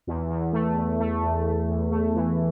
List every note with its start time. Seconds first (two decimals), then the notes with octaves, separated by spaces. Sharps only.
0.07 E2
0.30 E2
0.53 A3
0.77 E2
1.00 A3
1.23 E2
1.46 A3
1.69 E2
1.92 A3
2.15 E3